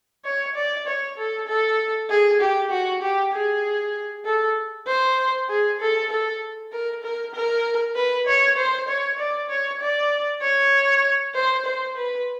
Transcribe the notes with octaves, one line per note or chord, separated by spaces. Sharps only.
C#5
D5
C#5
A4
A4
G#4
G4
F#4
G4
G#4
A4
C5
G#4
A4
A4
A#4
A#4
A#4
B4
C#5
C5
C#5
D5
C#5
D5
C#5
C5
C5
B4